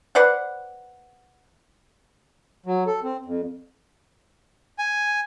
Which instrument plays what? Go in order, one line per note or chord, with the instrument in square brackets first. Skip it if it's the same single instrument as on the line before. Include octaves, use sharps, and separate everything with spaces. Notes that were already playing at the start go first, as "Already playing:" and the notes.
[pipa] B4 C5 D5 F#5
[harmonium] F#3
A4
C4
F2
[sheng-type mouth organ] G#5